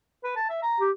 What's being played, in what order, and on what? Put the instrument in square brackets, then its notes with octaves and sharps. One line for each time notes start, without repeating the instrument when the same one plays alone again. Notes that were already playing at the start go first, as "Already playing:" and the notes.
[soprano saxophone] B4
A5
E5
A#5
[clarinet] G4